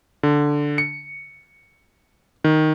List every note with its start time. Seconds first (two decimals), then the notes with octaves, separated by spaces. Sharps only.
0.23 D3
0.78 C#7
2.44 D#3